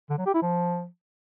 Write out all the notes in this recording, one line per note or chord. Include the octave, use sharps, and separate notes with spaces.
D3
F#3
G4
E4
F3